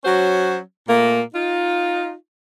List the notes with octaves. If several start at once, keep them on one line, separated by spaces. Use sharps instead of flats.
F#3 C#4 F#4 C5
A#2 A3 A#3
D#4 F4